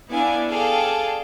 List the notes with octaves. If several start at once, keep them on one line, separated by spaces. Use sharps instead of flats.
B3 D4 E4 D5 F5 G#5
G#4 A4 D5 F5 G5